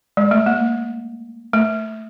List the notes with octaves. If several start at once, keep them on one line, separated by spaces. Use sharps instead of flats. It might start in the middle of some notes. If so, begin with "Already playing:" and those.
G#3
A3
A#3
A3